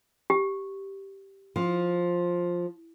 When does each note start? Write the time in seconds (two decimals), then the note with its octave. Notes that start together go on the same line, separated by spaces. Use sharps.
0.30 G4
1.56 F3